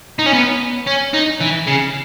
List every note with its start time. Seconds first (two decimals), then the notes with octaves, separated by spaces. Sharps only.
0.19 D#4
0.26 C#4
0.34 B3
0.87 C#4
1.13 D#4
1.41 E3
1.67 C#3